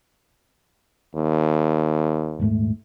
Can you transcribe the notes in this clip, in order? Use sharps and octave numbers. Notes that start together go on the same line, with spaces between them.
D#2
D#1 G#2 A3